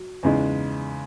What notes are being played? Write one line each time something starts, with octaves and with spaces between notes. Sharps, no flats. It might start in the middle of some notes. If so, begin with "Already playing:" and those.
Already playing: F#3
E2 C#3 G#3 D#4